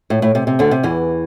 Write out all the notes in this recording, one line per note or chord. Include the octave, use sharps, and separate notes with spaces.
A2
A2
C3
C3
D2 D3
C3
E2 E3